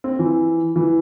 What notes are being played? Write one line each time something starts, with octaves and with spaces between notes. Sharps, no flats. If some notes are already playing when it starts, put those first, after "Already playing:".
C4
E3
E3